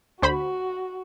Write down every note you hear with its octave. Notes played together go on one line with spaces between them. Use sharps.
D2 F#4 C5 B5